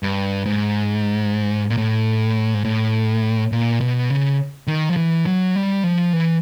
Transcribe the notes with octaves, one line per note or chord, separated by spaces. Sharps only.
G2
G#2
A#2
A2
G#2
A2
A#2
B2
C#3
D#3
F3
E3
F#3
G3
F3
E3